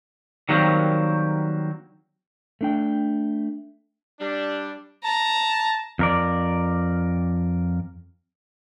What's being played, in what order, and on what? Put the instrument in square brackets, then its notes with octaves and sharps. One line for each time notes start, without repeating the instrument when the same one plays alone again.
[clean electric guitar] D#3 F#3 G3 A#3 C4
[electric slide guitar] A3 D4 G5
[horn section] G3 D4
[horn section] A5 [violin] A#5
[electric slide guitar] F2 A#4 D5